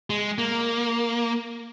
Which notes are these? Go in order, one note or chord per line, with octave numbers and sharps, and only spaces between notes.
G#3
A#3